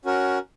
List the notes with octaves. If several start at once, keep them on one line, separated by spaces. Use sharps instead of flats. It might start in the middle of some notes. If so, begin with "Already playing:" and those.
C#4 F#4 A#4